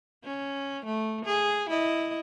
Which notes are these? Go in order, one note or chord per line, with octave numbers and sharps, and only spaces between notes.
C#4
A3
G#4
E4 D#5